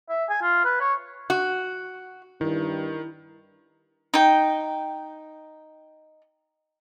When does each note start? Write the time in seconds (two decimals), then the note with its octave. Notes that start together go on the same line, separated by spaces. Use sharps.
0.09 E5
0.30 G#5
0.42 F4
0.65 B4
0.81 C#5
1.30 F#4
2.41 G2 D#3 E4
4.14 D#4 G5